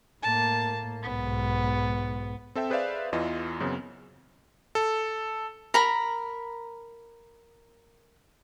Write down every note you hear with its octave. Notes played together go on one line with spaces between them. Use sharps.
A2 A#3 A5
B1 G#2 B3
C4 A4 E5 G5
G#4 B4 C5 D5 E5 F5
E2 E3 F4 D#5
F#2 C#3 B3 C4
A4
A#4 A#5 B5